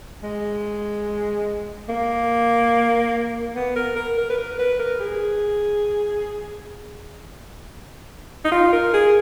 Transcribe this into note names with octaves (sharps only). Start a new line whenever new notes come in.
G#3
A#3
B3
A#4
A#4
A#4
B4
A#4
B4
A#4
G#4
D#4
F4
A#4
G#4